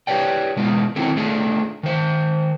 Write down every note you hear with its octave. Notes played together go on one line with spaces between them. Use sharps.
G4 B4 C#5 D5 G5
B2 G#3 B3 D#4 F4
D#3 F#3 C4 D#4 E4 A4
A3 D4 F4 G#4 A4
D#3 C5